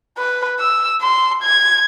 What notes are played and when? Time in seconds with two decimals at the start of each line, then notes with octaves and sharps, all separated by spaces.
0.18 B4
0.60 E6
1.02 C6
1.43 G#6